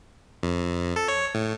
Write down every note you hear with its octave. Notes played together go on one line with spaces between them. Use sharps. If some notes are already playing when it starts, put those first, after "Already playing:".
F2
A4
C#5
A2